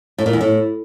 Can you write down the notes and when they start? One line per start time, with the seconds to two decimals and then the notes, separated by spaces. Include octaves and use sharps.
0.18 A2
0.26 A#2
0.33 E2
0.41 A2